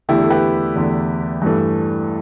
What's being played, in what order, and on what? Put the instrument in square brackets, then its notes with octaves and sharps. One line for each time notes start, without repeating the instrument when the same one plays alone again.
[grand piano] E2 D3 A3 E4 G4
A4
G4 B4
E2 D3 A3
G2 E3 A3